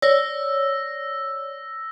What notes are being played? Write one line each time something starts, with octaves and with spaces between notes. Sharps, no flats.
C#5 D5 E6 A#6